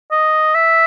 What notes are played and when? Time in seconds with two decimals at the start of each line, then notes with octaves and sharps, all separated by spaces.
0.11 D#5
0.55 E5